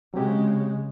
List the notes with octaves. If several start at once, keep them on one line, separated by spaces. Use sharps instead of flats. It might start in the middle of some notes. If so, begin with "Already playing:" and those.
C#3 F#3 G#3 C4 G4